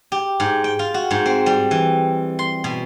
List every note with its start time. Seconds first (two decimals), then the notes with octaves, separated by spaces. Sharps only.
0.12 G4
0.40 G#2
0.64 G5
0.79 F4
0.94 F#4
1.11 G#2
1.26 C4
1.46 G3
1.71 E3
2.39 C6
2.64 B2